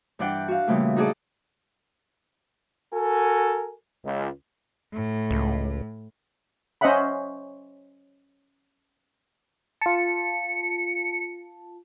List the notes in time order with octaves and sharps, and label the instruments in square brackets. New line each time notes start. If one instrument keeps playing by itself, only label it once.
[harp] G2 E3 D4 D5 F#5 G5
F#4 F5
A#2 C#3 E3 G3 A3
D#4 F#4 G#4 A4 D5 D#5
[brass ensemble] F#4 A4 A#4 G#5
C#2
[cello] A2
[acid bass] C#2
[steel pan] C#4 C5 D#5 E5 F#5 B5
[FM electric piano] F4 A5 [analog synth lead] C#7